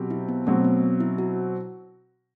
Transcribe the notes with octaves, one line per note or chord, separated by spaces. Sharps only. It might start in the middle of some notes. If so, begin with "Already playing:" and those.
Already playing: B2 F#3 C4 G4
E4
B3
B2 F#3 A3 C4
B3
E4
F#4